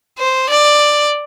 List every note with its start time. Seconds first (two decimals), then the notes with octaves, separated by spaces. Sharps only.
0.19 C5
0.50 D5